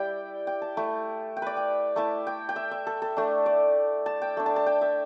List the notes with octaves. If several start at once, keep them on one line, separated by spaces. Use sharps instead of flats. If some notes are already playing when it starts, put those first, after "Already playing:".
Already playing: G3 E4 D5 G5
G5
A5
A3 E4
G5
B4 D5
G5
A3 E4 A5
G5
G5
E5
E5
A4
A4
A3 D4
D5
A5
G5
A3 D4
A5
A5
G5
E5